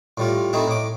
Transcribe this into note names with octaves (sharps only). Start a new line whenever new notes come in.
A2 G3 F4
A3 C4 D#4 E4
A2 D6